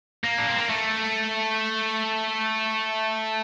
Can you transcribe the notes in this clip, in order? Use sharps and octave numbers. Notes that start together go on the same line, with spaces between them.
A#3
D4
C4
A#3
A3